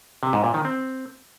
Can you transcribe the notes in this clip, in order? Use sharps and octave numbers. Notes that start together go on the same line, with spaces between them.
C3
G#2
A#2
D#3
C4